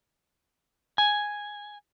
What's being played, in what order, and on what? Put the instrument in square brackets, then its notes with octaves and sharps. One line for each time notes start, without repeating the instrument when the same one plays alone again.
[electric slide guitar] G#5